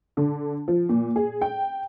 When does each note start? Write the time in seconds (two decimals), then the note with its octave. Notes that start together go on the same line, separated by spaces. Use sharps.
0.17 D3
0.68 F3
0.89 A#2
1.16 G#4
1.41 G5